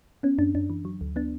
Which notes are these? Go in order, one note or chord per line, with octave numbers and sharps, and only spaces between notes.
B3 C#4
F#2 D4
F#2 D4
E3
F#3
D2
B3 D4